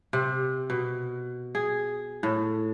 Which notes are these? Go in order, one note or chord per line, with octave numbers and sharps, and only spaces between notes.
C3
B2
G#4
A2